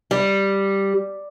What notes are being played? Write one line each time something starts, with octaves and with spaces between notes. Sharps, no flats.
G3